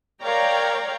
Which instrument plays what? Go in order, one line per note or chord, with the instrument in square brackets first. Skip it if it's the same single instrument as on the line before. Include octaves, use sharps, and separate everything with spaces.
[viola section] A#4 C#5 D5 F5 G5 A#5